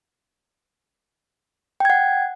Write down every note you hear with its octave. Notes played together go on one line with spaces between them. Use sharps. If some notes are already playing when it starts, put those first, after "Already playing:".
F#5 G5 G#6